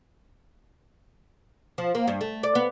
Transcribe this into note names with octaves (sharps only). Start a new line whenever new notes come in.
F3
A#3
G2
A3
D5
B3